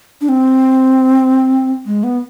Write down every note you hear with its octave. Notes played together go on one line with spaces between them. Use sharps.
D4
C4
G#3
B3